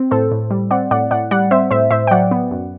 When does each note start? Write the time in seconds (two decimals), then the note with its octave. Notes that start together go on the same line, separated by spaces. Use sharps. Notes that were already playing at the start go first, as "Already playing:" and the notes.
Already playing: C4
0.11 A2 A4 C5
0.32 A2
0.51 G3
0.71 C4 D5 F#5
0.91 A2 D5 F#5
1.11 A2 D5 F#5
1.31 G3 D5 F#5
1.51 C4 C5 E5
1.71 A2 C5 E5
1.91 A2 C5 E5
2.07 G5
2.11 F#3 D5 F#5
2.31 B3
2.51 F#2